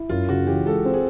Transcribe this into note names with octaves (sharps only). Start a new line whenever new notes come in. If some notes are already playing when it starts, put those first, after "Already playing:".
Already playing: E4
F#2 F4
C#3 F#4
E3 G4
G#3 A4
C4
G#4